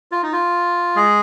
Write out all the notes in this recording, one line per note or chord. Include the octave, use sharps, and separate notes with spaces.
F4
D#4
F4
G#3 G#4